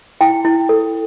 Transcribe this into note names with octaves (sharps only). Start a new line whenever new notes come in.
E4 G5
E4
A4